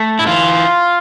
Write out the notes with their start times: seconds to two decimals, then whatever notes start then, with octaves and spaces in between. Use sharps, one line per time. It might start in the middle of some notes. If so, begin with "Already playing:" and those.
Already playing: A3
0.19 E4
0.26 E3 F4